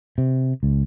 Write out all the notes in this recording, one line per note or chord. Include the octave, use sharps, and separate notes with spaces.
C3
C#2